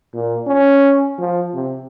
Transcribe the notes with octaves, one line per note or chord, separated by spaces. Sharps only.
A#2
C#4
F3
C3